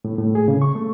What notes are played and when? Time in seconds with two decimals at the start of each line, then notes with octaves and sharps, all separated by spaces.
0.05 A2
0.18 A2
0.35 G#4
0.48 C#3
0.62 C#6
0.75 A3